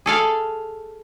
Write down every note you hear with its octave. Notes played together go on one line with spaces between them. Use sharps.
G#4 A4 F5